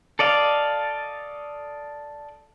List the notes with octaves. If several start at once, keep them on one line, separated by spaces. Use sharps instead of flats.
A4 D5 D#5 F5